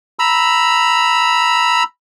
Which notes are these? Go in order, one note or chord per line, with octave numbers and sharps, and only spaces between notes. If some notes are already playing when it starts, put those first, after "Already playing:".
A#5 B5 E6